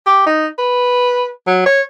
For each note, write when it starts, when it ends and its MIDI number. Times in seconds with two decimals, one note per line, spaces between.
0.06 0.24 67
0.27 0.47 63
0.58 1.29 71
1.47 1.64 54
1.66 1.82 73